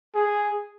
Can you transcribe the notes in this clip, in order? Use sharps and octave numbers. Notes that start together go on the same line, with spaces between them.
G#4